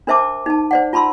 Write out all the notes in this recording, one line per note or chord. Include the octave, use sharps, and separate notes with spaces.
D4 A#4 C5 E5 A5 D6
D#4 A5
C5 D5 F#5
F4 A5 B5 C6 E6